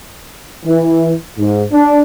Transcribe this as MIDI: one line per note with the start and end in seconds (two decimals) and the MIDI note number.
0.64 1.12 52
1.37 1.62 44
1.71 2.01 62